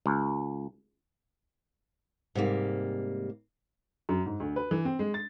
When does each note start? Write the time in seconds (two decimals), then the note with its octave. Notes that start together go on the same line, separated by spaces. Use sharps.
0.06 C#2
2.35 G#2 C3 G3 A#3
4.09 F#2
4.26 G#2
4.40 D2
4.56 B4
4.71 E3
4.85 C4
4.99 G#3
5.14 A6